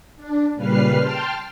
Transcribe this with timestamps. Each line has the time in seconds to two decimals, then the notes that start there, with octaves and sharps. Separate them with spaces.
0.17 D4
0.55 A#2 C#3 G3 B4 F6 C7
0.99 G5 A5 C6 F6